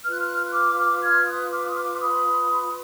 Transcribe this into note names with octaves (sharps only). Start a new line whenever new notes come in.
F4 B4 F6
F#6
F6
F#6
F6
F#6
D6 F6
D6 F6
F6 G#6
D#6 F#6
D6 F6
D#6
D6 F6
B5 D#6